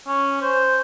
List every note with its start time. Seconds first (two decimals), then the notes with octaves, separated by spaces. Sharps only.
0.07 C#4
0.42 C5